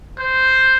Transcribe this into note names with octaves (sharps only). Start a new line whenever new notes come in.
C5